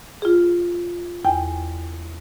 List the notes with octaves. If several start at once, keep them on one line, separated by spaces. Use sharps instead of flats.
F4 G#4
E2 G5 G#5